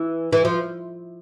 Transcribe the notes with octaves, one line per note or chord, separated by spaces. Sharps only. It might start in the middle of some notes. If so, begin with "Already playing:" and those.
Already playing: E3
E3
F3